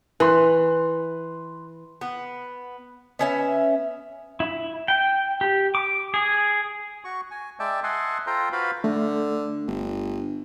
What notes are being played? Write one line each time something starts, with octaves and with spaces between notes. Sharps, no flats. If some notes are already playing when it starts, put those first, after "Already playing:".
E3 B4 C6 F#6
B3
B3 C#4 E5
E4
G5
G4
D6
G#4
F#4 C#6
G#5
G#3 D5 E5 G5 A5
D#5 E5 F#5 G#5 A5 C6
F4 A4 C5 G5 A#5 C6
F4 F#4 B4 C5 F5 B5
D3 A3
G1